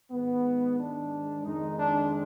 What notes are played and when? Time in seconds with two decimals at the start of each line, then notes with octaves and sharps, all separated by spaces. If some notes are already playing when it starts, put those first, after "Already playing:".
0.11 G#2 D#3 G#3 B3
0.78 D4
1.44 F2 D#3 G#3 D#4
1.77 D4